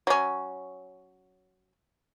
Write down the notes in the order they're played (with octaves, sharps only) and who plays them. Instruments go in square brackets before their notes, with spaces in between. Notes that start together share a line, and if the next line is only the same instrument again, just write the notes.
[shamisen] F#3 C#4